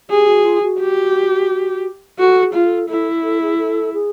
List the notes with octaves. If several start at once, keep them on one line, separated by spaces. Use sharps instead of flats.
G4 G#4
F#4
F4
F#4
G4
F#4 A4
G#4
F4
A4
E4 A4
A4
G#4
A4
G#4